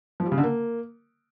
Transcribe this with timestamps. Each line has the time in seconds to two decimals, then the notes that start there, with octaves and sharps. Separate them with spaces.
0.20 F3
0.26 G3
0.32 C#3
0.38 D3
0.44 A#3